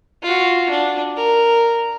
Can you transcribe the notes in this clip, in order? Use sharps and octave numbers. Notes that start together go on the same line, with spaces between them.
F4 F#4
D4
A#4